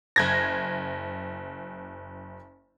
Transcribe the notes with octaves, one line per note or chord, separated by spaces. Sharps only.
F#1 G#6 A#6